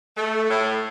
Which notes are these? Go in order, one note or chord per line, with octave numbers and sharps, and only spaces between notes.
A3
A2